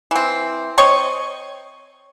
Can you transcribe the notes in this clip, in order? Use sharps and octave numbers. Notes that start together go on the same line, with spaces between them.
E3 C4
C4 C#5 D#5 C#6